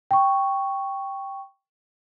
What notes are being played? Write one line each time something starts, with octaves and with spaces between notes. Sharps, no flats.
G5 C#6